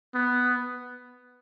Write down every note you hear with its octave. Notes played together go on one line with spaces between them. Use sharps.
B3